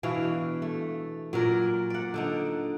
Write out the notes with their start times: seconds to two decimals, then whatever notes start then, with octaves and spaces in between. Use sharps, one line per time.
0.03 B2 E3 D4 F5
0.62 A3
1.33 A#2 F#3 A#4 D5
1.90 D5 F#5
2.14 D3 D4 D#4